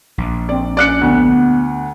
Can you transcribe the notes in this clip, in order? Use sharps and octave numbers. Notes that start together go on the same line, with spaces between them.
A#1
C4 D5
C#4 D5 F#6 C#7
D2 B3